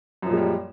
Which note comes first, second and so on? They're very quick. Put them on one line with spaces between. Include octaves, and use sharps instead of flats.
F#2 F3 A#2 G#3 G3